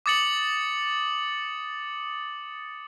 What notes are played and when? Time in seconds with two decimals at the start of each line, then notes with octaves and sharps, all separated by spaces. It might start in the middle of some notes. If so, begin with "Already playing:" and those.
0.06 D6 D#6 A6 C#7 F#7